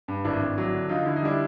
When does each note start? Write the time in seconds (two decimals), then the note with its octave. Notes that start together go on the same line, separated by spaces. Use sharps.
0.08 G2
0.24 G#1 D4 E4
0.41 G#1
0.58 F#3
0.74 D3
0.89 D3 D#4 F4
1.05 D3 E4
1.16 D#4
1.22 G3 D4 E4